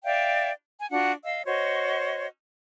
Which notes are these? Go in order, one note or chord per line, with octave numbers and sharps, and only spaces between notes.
D5 E5 F5 G5
G#5
D4 F4 F#4 F#5
D#5 F5 E6
F#4 C5 C#5 D#5